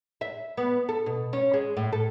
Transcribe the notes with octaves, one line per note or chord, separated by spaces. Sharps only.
E5
B3
A4
B2
C#4
G#3
A2
A4